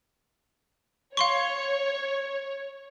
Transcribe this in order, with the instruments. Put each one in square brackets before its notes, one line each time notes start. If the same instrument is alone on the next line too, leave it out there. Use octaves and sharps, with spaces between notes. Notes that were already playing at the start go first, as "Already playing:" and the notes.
[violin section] C#5 [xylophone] F5 C6 C#6